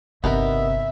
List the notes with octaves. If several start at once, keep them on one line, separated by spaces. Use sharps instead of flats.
G1 C3 B3 D#4 A#4 E5